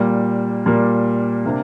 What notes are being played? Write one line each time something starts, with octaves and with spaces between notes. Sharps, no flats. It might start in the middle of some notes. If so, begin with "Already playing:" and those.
Already playing: A#2 G3 A#3
A#2 G3 A#3
C3 A#3 D4